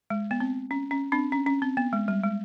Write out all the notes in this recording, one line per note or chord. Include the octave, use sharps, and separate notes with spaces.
G#3
B3
C4
C#4
C#4
C4 D4
C#4
C#4
C4
B3
G#3
G3
G#3